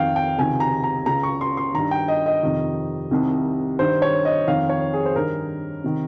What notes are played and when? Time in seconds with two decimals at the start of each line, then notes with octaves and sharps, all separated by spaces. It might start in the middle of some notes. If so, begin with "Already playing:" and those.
Already playing: F2 D#3 F5 G5
0.16 G5
0.38 C#2 C3 D#3 G#5
0.60 A#5
0.84 A#5
1.06 C#2 C#3 A#5
1.23 C#6
1.41 C6
1.57 C6
1.74 G2 D#3 A#5
1.91 G5
2.08 D#5
2.26 D#5
2.43 F2 C3 D#3
3.11 C2 C3 D#3
3.79 G2 D#3 C5
4.02 C#5
4.25 D#5
4.47 F2 D#3 F5
4.69 C#5
4.93 G#4
5.06 C5
5.15 G2 D#3 A#4
5.84 C3 D#3